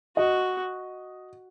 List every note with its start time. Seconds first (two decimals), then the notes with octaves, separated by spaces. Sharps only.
0.17 F#4 D#5